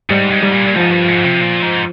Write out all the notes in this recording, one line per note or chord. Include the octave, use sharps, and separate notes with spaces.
G#2 G3
G#2
G3
A#2
A#2
G#2 F3
G2
G#2
C3
A#2
G#2